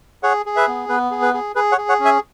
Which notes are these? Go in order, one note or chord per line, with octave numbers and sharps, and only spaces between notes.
G#4 C#5 F#5
G#4
B4 E5
B3
B3 B4
G#4
B4
G#4
G#4 B4
C#5 F#5
G#4
C#5 F#5
C#4
E5 G#5